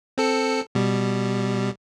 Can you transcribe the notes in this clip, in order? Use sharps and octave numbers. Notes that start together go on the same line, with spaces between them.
C4 A4 C#7
B2 G3